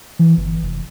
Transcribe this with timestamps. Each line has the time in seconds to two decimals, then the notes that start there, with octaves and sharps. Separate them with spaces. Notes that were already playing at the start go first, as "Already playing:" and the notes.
0.19 E3
0.37 G1
0.63 F1